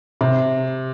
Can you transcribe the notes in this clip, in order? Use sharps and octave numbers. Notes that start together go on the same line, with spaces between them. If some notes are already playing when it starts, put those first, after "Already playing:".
C3